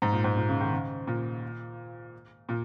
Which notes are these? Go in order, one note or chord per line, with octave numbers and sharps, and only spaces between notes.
G#2
A#2
G#2
A#2
C#3
D#3
C#3
A#2
A#2